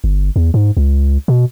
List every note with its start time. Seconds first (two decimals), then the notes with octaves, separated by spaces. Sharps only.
0.04 G1
0.36 E2
0.54 G#2
0.77 C#2
1.28 B2